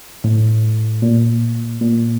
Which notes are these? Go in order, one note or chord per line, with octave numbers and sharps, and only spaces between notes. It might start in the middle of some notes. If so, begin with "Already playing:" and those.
A2
A#2
A#2